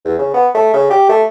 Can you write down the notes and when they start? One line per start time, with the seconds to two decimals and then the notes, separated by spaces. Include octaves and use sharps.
0.05 E2
0.19 C#3
0.34 B3
0.55 A3
0.74 C#3
0.91 G4
1.09 A3